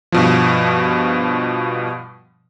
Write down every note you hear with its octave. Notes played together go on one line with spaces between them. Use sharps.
G2 B2 F3